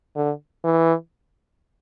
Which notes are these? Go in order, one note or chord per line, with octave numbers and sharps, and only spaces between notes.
D3
E3